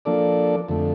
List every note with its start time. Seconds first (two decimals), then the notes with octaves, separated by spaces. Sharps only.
0.05 F3 A#3 D4 A4 D5
0.68 F2 D3 A3